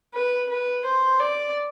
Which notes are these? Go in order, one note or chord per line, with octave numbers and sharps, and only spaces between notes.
B4
B4
C5
D5